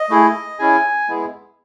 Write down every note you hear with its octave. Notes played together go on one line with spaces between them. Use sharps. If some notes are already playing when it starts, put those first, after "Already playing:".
Already playing: D#5
A3 E4 G#4
C#4 E4 G#4 G#5
G#3 B3 E4 G#4